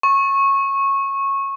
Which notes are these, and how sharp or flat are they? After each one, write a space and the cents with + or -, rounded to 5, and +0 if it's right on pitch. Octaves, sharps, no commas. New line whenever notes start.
C#6 -15